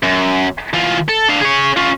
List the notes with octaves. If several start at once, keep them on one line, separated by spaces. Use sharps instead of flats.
F#2
E3 F4
A4
D4 F5
G#4 C#5
C#4 F4